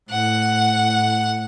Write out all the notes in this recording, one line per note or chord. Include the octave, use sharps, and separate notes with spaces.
A2 F#5